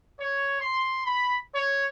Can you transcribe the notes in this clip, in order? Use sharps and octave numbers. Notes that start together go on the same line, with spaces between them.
C#5
C6
B5
C#5